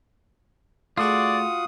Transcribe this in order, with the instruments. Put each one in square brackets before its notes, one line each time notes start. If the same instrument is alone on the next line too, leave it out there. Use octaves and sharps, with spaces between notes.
[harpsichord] A3 G#4 [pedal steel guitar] F4 F#4 [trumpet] D5 [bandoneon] D#6